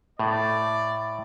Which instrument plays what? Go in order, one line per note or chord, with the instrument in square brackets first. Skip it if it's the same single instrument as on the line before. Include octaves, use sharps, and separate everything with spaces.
[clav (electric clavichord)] A2 [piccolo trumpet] D5